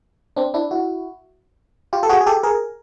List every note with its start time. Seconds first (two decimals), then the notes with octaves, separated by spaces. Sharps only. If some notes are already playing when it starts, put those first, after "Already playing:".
0.36 C4 D4
0.54 D4 E4
0.71 E4 F#4
1.93 F4 G4
2.03 A4
2.09 F#4 G#4
2.21 G#4
2.26 G4 A4
2.43 G#4 A#4